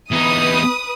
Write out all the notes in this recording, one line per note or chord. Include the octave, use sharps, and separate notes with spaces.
E2 D#4 B4 D#6